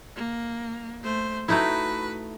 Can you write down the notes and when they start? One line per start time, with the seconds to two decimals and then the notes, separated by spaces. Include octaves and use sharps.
0.16 A#3
1.04 A3 C5
1.48 A3 D#4 E4 F#4 B4